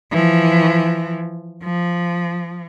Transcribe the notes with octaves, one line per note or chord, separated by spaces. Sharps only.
E3 F3
F3